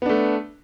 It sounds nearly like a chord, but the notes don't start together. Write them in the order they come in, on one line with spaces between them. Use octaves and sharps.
B3 D4 A3